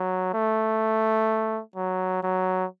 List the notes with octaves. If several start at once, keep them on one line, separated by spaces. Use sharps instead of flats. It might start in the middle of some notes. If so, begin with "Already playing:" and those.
Already playing: F#3
A3
F#3
F#3